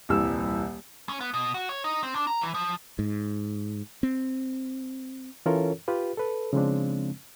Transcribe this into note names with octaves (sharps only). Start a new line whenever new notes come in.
D#1 C2 E3 E6
C#4
B3
B2
F#4
C#5
D#4
C4
D4
A#5
E3
F3
G#2
C4
E3 C#4 F4 A4 A#4 C#5
F4 G4 B4
A4 B4
C#3 F3 G#3 C4 D4